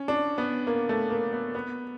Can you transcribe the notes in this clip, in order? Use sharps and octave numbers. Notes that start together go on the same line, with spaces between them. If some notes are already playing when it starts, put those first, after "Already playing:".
Already playing: C#4
D4
B3
A#3
A3
A#3
B3
B3